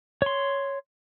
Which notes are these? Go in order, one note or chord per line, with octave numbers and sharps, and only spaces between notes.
C#5 C6